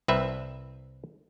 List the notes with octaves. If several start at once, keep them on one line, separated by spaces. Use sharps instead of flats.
C2 C4 B4 E5